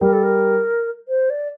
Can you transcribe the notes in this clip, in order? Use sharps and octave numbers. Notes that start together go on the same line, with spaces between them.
G3 A#4
A4
A#4
C5
D5